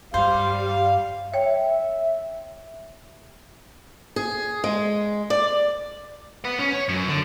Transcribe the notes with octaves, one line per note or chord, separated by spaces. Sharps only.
G2 G3 C5 F5
C#5 E5 G5
G#4
G#3
D5
B4 F#5
C#4
C#5
F#2
D3